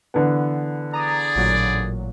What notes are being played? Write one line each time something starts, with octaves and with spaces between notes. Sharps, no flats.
D3 E3 B3
G#4 D5 A#5 D#6
A1 A#2 F#3